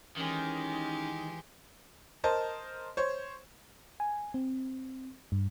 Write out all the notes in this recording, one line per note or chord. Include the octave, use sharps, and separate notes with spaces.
D#3 E3 G#3 C#4 G4
A#4 C5 D#5 A5
C5 C#5
G#5
C4
G2